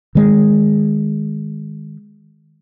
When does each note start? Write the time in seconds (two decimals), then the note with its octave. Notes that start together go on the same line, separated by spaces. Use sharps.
0.15 D#3 G#3